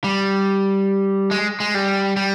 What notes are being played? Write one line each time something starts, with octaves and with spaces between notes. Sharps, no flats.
G3
G#3
G#3
G3
G3